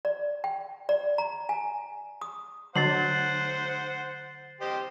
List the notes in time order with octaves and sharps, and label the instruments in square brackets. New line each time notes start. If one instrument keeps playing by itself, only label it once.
[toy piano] D5
G5
D5
A#5
G#5
D#6
[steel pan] D3 F#3 [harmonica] C5 F#5 [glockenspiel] A6 C7 F#7
[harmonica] G4 C5 D#5